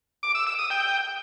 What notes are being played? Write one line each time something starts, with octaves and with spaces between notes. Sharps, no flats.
D6
E6
E6
D#6
G5